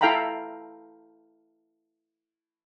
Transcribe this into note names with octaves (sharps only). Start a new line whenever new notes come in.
E4 A4 F5 G5 A#5 B5